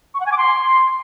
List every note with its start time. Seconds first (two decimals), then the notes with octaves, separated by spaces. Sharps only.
0.14 C#6
0.20 F#5
0.26 G#5
0.32 D6
0.38 C6